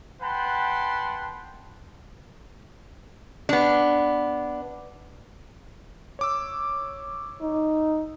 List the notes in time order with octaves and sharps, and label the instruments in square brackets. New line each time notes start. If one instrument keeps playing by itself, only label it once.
[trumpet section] B4 F#5 G5 A5 B5 C6
[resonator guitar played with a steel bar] B3 D4
[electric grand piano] C#5 D6 E6
[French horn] D#4